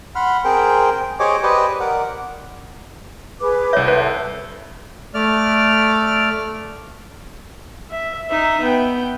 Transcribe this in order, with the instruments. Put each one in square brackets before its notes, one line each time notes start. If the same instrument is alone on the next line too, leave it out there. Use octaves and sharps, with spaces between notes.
[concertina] F#5 B5 C6 F6
C4 G#4 A#4 C5 G5
G4 G#4 C5 C#5 D#5 D6
G4 B4 C5 D5 D#5
A#4 D5 F#5
[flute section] G#4 B4 D6
[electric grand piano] C2 G6 [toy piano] C#5 E5
[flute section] A4 [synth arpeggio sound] B4
[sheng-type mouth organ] A3 D5 F6
[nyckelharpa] E5
D#4 E5
B3 G5